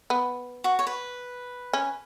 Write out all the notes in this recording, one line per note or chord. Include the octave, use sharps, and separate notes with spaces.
B3
F#4
C#5
B4
C#4